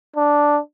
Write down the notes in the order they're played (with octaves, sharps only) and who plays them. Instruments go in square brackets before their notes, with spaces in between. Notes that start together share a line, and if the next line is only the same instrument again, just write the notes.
[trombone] D4